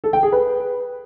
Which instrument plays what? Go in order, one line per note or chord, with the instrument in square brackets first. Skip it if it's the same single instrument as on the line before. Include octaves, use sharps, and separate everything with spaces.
[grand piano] A4
G5
G#4
B4